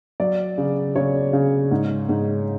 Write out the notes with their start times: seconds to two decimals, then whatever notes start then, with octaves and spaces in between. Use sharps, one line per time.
0.20 F#3 D5
0.58 C#3
0.96 C#3 C#5
1.33 C#3
1.71 G#2
2.09 G#2